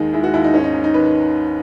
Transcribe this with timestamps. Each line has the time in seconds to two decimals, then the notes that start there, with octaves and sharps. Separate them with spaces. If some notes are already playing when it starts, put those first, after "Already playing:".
Already playing: D#2 D#3 G#3 D#4
0.13 G#3 E4
0.23 F#4
0.34 D#2 E4
0.44 D#4
0.53 G#2 C#4
0.64 D#4
0.74 G#2
0.84 D#4
0.94 D#3 B4